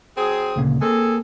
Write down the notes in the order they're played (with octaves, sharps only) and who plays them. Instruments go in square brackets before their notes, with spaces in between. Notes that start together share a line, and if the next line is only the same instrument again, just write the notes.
[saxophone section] F#3 C4 G#4
[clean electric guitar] D2 A#2 C#3
[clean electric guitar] A#3 [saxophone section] C4 G#4 A4